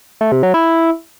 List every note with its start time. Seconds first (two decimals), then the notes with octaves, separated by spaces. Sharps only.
0.21 A3
0.32 C3
0.43 F#3
0.54 E4